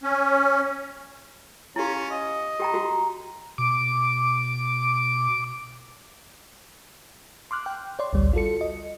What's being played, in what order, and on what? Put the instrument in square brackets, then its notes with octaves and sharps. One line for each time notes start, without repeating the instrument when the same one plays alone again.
[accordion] C#4
[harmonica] C#4 F4 [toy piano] E4 G4
[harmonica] D#5
[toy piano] G4 G5 A#5 [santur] B4 C6
[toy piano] F#4 G4 [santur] A#5
[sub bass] B2 [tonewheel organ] D6
[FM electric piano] C6 D6 F6 F#6
G5
C#5 D5 C6
A1 D2 G3
F4 F#4 A4 C#7
D#5